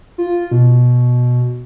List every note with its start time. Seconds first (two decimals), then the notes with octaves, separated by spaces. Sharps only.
0.18 F4
0.51 B2